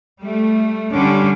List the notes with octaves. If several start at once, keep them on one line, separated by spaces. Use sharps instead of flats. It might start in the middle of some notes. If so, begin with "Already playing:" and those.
G3 A3
D3 G3 C#4 D4